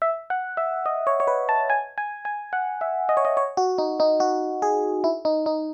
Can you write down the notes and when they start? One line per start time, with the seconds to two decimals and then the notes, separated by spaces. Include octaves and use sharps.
0.02 E5
0.30 F#5
0.57 E5
0.86 D#5
1.07 C#5
1.20 C#5
1.27 B4
1.49 A5
1.70 G#5
1.98 G#5
2.25 G#5
2.53 F#5
2.81 E5
3.09 D#5
3.17 C#5
3.25 D#5
3.37 C#5
3.57 F#4
3.78 D#4
4.00 D#4
4.20 F#4
4.62 G#4
5.04 E4
5.25 D#4
5.46 D#4